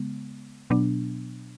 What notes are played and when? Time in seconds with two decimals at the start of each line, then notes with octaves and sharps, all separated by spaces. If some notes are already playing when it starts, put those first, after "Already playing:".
Already playing: C#3 G#3 B3
0.70 B2 F#3 B3 D4